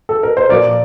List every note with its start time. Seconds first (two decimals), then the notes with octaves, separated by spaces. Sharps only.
0.09 A4
0.23 A#4
0.37 C5
0.49 A#2 F3 A#3 A#4 D5